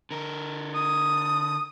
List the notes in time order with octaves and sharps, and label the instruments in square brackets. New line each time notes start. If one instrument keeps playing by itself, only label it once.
[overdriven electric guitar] D3 A#4
[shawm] D#6